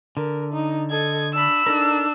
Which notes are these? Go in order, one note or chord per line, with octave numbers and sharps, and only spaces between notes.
D3 A#4
D#4
A4 D#5 G#6
D4 B5 E6
D4 D#4 A4 A#4